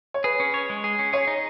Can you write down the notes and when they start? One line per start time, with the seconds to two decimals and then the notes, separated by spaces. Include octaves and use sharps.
0.14 C#5
0.24 G#4 B4
0.40 C#4
0.54 C#5
0.70 G#3
0.84 G#4
0.99 C#4
1.13 G#4 C#5
1.27 D#4